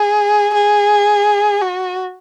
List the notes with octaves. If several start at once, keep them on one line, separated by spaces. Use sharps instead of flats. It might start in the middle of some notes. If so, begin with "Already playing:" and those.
Already playing: G#4
G#4
F#4